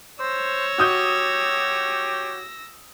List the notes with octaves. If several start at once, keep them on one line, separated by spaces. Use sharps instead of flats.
C5 C#5 E6 A#6
F#4 G4 D#6 G6